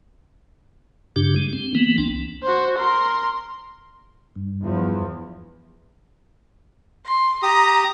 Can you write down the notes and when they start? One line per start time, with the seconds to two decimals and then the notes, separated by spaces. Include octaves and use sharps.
1.16 G2 C#3 D4 G4
1.36 G#3
1.53 C4
1.75 E3 A#3 B3
1.98 C2 D4
2.43 F#4 C5
2.79 A#4 C6
4.36 G2
4.64 E2 F3
7.05 C6
7.43 G4 A#5 D#6